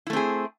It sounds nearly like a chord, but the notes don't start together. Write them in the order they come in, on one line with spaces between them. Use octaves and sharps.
E4 A3 C4 G#4